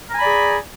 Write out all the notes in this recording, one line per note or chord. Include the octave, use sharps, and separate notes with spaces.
G#4 D5 G#5 A#5 B5